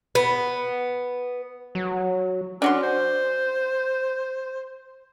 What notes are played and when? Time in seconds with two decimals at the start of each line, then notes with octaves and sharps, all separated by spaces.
0.15 B3
1.75 F#3
2.62 C#4 D4 F#4 C6
2.83 C5